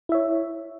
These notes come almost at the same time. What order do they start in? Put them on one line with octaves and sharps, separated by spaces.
E4 E5 C#5